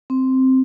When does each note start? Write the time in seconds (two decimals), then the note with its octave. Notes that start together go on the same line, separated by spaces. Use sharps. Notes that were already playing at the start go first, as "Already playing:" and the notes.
0.10 C4